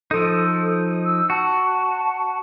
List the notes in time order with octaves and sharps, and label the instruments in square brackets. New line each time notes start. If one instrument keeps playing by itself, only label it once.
[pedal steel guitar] F3 D#4 [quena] A4
[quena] E6
[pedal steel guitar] F#4 [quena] A5